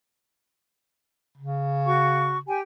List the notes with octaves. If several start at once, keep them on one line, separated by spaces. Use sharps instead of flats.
C#3
F#4 C#6
G4 G5 G#5